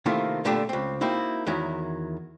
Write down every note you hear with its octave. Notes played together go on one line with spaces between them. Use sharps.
C3 D#3 A3 A#3 E4 F4
A#2 D3 A3 B3 D4 G4
C#2 C4
A#3 C4 D#4 E4 F#4
E2 D#3 F#3 E4